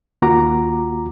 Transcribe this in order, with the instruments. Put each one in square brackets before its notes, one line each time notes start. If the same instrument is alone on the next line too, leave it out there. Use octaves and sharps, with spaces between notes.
[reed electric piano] D#2 A#3 F4 F#4 A#5 D6